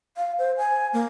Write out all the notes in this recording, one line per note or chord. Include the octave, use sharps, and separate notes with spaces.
F5
C5
G#5
A#3